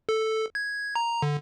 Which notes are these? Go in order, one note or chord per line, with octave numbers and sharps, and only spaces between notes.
A4
G#6
A#5
D3